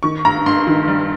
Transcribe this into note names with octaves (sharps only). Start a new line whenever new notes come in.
D#3 C#6
G2 A#5
G2 C6
D#3
G3